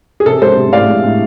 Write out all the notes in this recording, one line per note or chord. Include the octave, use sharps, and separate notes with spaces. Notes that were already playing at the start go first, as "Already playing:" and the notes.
G#4
C3 A4
G#3 A4 C5
C3
A2 D5 F5
G#3
A2